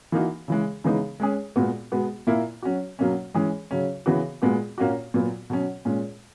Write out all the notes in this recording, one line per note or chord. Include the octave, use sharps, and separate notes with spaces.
E3 A#3 D#4 F#4
C#3 E3 G#3
C#3 E3 G#3 B3 D#4
G#3 C#4 G#4
A#2 G#3 B3 F#4
B2 G#3 B3 F#4
A#2 A#3 E4
F#3 C#4 F#4
B2 F#3 A#3 C#4
E3 G#3 C#4 G#4
C#3 F#3 C#4
C#3 E3 B3 F#4
A#2 G#3 B3 F#4
A#2 A#3 C#4 F#4
A#2 F#3 B3
B2 F#3 C#4
A#2 G#3 C#4